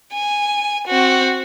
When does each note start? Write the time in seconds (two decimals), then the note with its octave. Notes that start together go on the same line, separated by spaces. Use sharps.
0.13 G#5
0.87 C4 F#4